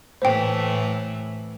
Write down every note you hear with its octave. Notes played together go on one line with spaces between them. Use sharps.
A2 E3 A3 C5 G5